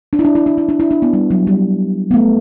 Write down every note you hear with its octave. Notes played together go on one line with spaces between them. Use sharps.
D4
E4
D4
E4
D4
E4
D4
E4
D4
B3
G3
F#3
G3
B3
A3